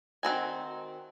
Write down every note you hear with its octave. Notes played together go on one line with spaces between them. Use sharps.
D#3 C4 F#4 G#5